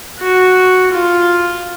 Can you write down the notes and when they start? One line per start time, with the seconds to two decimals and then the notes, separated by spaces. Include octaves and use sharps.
0.19 F#4
0.92 F4